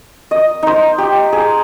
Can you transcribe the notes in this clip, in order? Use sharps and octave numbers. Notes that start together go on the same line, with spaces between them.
D#5
D#4 C5
G4
G#4